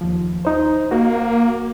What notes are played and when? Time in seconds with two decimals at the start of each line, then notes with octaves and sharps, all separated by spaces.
0.01 D#2 F3
0.45 D#4 C5
0.91 A#3 F#4